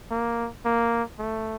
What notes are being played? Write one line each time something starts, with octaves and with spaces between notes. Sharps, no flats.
A#3
A#3
A3